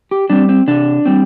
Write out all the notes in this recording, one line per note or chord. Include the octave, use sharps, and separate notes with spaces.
G4
G3 C4 D4
C4
C3 D4
G3 C4